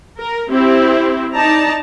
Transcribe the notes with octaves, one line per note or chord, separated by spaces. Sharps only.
A#4
C4 E4 G4
D#4 D5 A5 A#5